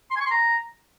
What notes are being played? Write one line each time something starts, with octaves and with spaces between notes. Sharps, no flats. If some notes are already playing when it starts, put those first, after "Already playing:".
C6
G#5
C#6
C6
A#5